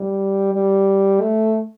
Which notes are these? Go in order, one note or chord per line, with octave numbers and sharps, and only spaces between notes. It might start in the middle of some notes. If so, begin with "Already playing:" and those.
Already playing: G3
G3
A3